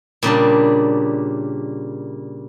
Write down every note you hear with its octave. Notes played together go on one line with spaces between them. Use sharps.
A#2 C#3 G3 D4